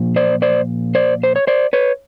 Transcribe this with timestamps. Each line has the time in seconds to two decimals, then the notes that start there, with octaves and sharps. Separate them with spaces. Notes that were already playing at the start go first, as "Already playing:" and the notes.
Already playing: A#2 F3
0.16 C5 D5
0.42 C5 D5
0.95 C5 D5
1.23 C5
1.36 C#5
1.47 C5 D5
1.73 B4 C#5